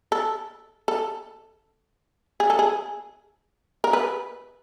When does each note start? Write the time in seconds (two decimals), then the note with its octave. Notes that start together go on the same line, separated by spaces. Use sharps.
0.12 A4
0.88 A4
2.40 G#4
2.50 A4
2.59 G#4
3.84 A#4
3.93 B4